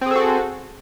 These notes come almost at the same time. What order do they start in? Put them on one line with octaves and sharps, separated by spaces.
C4 G#4 A4 F#4